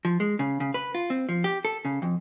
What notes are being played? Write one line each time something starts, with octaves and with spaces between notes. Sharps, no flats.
F3
G#3
C#3
C#3
B4
F4
C4
F3
G4
A4
C#3
F2